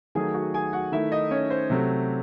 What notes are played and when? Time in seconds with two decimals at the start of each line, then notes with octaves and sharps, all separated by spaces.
0.15 D#3 F#3 A3 G#4 G#5
0.34 F#4 F#5
0.54 G#4 G#5
0.73 F#4 F#5
0.92 D#3 A3 E4 E5
1.11 D#4 D#5
1.31 C#4 C#5
1.50 C5
1.70 C3 F#3 A3